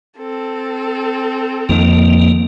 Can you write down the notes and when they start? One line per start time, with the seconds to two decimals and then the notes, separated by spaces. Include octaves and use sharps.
0.18 C4 A4
1.69 F2 D#3 A#3